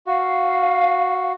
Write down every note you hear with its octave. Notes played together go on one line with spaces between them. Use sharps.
F#4 F5